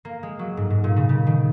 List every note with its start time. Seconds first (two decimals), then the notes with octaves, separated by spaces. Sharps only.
0.05 A#3
0.23 G#3
0.39 F#3
0.57 G#2
0.70 G#2
0.84 A#2
0.96 C#3
1.09 C#3
1.27 D#3